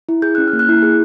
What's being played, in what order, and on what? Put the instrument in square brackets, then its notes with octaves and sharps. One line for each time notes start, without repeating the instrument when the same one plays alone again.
[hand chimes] E4
G#4 G6
C#4 F#6
F6
A#3
F#6
E4
G#4